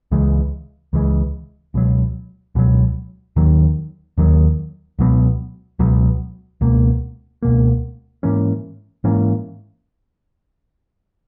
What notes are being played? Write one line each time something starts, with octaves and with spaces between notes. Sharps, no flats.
C#2 C#3 E3 G#3
C#2 C#3 E3 G#3
C#2 B2 F#3
C#2 B2 F#3
D#2 D#3 F#3
D#2 D#3 F#3
C#2 B2 F#3 B3
C#2 B2 F#3 B3
C#2 B2 A#3
C#2 B2 A#3
G#2 E3 A#3 C#4
G#2 E3 A#3 C#4